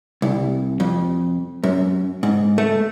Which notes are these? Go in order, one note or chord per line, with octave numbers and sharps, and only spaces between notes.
C2
F2
F#2
G#2
A3